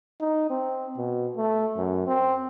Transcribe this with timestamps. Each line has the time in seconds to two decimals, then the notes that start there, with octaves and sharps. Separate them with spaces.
0.20 D#4
0.50 C4
0.97 B2
1.37 A3
1.77 F#2
2.07 C4